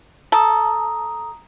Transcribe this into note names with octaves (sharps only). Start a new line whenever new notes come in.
A4 A#5 D#6